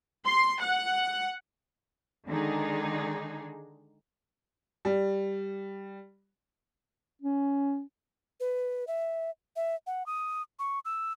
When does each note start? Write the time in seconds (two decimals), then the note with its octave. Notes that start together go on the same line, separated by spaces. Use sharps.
0.25 C6
0.61 F#5
2.27 D3 D#3 G#3 D4 D#4 G#4
4.85 G3
7.22 C#4
8.40 B4
8.87 E5
9.56 E5
9.87 F#5
10.06 D#6
10.59 C#6
10.85 E6